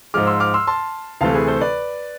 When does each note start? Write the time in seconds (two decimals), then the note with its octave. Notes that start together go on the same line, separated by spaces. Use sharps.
0.14 G#2 F3 G#3 D6 F6
0.27 C6 E6
0.40 D6 F6
0.54 C6 E6
0.67 A5 C6
1.21 D2 C3 E3 A3 F5 A5
1.34 G#4 B4
1.48 A4 C5
1.61 B4 D5